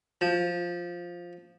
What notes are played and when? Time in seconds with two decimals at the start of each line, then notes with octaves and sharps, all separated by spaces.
0.21 F3